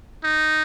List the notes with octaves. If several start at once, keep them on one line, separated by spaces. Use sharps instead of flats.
D#4